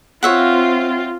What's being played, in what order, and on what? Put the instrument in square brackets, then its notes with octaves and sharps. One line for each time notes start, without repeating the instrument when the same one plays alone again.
[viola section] C4 F4 [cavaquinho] C#5 E5 F#5